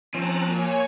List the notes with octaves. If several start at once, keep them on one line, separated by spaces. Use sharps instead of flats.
F3 C4 C#4 A5 A#5 F#6
A#2 C#5 G#5